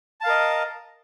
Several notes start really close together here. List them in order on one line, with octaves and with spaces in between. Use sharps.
A5 F5 A#4 D#5